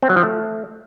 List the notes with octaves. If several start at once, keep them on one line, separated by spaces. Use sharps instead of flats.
C4
F#3
F3
A3